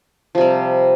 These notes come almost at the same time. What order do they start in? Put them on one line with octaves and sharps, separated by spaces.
F3 C3 G3